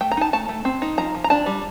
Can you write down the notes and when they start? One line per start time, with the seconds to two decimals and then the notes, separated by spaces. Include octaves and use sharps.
0.01 A3 G5
0.11 A#5
0.17 D#4 A5
0.33 A3 A5
0.49 A3
0.65 C4
0.82 D#4
0.98 F3 A#5
1.15 F3
1.24 A#5
1.30 D4 A5
1.46 G3